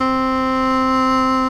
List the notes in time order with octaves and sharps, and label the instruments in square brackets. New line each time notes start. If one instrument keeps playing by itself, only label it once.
[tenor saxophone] C4